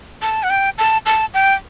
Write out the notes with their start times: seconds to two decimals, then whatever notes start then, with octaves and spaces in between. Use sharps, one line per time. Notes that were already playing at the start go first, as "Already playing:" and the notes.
0.22 A5
0.43 F#5
0.50 G5
0.78 A5
1.06 A5
1.34 G5